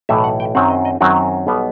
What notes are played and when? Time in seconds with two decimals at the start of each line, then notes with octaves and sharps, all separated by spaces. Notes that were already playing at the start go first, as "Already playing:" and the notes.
0.09 B1 A2 E3 A3 E5
0.24 F#5
0.40 G5
0.55 F#2 D#3 F#3 C4 F#5
0.70 D#5
0.85 D#5
1.01 F#2 D#3 F#3 C4 F#4
1.47 B1 B2 G3 B3